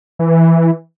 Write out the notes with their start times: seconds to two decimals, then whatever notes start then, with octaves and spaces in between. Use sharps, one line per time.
0.19 E3